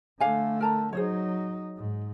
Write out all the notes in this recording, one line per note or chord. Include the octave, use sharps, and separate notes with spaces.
D3 A3 D4 F5 G#5
A#4 A5 A#5
F#3 D#4 G#4 C5 C#5
G#2